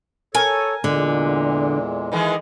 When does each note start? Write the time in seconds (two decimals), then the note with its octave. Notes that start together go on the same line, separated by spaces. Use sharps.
0.35 A4 A#4 C#5 G#5
0.84 E2 A#2 D3 G#3
2.12 D#3 E3 G#3